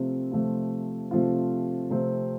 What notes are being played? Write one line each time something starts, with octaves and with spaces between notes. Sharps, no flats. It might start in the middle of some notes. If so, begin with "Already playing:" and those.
Already playing: C3 F3 A3 C4 F4
C3 F3 A3 C4 F4
C3 F3 A3 C4 F4
C3 F3 A3 C4 F4